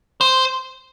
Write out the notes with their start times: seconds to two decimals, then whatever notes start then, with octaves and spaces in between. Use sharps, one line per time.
0.21 C5